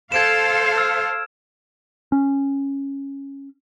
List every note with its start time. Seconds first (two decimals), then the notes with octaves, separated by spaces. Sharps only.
0.12 A4 C5 F5 G#6 D7 E7
0.77 E6 F6
2.12 C#4